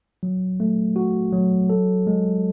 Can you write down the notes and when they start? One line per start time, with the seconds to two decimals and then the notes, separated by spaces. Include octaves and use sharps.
0.23 F#3
0.60 A3
0.96 F#4
1.32 F#3
1.70 A4
2.07 G#3